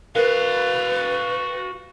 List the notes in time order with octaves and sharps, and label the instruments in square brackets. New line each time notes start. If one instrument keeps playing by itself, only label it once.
[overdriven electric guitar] F#4 F5 [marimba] A#4 F#6 [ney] B4